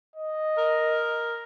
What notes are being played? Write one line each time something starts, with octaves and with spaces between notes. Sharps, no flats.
D#5
A#4